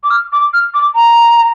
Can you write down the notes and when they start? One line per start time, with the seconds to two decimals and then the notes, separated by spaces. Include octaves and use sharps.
0.04 D6
0.10 F6
0.32 D6
0.53 F6
0.74 D6
0.95 A#5